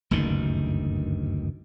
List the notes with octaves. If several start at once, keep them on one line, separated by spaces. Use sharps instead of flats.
F#1 D2 G2 D#3